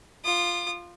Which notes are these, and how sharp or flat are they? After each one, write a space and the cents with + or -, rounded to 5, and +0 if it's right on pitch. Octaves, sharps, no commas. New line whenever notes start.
F4 +0 D#6 -40